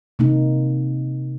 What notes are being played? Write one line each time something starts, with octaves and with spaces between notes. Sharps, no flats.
C3 A#3 D#4